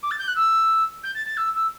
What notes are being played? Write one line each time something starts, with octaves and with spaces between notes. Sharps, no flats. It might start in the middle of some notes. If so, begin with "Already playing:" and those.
D6
A6
G6
F#6
E6
G6
A6
A6
E6
E6